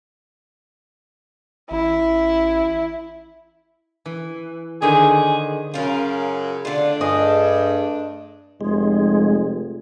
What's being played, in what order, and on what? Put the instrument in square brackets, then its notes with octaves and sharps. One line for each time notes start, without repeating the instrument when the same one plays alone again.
[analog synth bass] A1 [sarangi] E4
[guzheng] E3
[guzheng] D3 D#3 C5 [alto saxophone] G#4
[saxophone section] F#2 C#3 [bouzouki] F4 A#4
[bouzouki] D3 F4 [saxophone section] A3 D4
[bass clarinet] G2 [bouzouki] G#4 [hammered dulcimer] D#5
[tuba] F1 [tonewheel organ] G#3